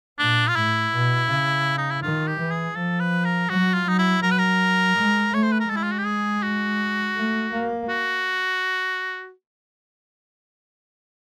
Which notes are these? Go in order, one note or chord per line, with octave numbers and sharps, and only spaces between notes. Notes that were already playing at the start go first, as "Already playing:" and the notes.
A#2 D4
F4
A2 E4
B2
C#3
D#4
E4
D#3 F4
G4
E3
G#4
F3 A4
B4
A#4
F#3 F#4
F4
F#3 D#4
E4
F#3 A#4
B4
A#4
G#3
A3 C#5
C5
B4
A#4
G#3 A4
E4
F4
F#4
G4
G#4
F#4
A3
A#3
F#4